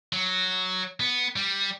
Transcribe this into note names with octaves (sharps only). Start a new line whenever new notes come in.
F#3
B3
G3